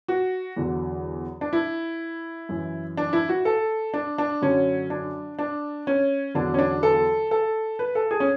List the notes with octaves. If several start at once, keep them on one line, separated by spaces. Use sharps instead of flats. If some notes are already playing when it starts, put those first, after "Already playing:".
F#4
E2 D3 F#3
D4
E4
F#2 E3
D4
E4
F#4
A4
D4
D4
F#2 D3 F#3 C#4
D4
D4
C#4
E2 D3 F#3 D4
C#4
D4
A4
A4
B4
A4
G#4
C#4